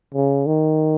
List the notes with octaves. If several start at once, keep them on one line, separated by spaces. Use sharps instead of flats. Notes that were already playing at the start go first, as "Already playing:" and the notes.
C#3
D#3